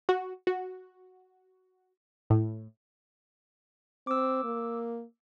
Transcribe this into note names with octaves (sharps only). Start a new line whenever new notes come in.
F#4
F#4
A2
C4 D6 E6
A#3